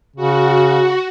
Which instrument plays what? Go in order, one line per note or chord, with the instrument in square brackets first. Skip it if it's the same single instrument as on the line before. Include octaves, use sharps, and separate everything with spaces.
[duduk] C#3 [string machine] F#4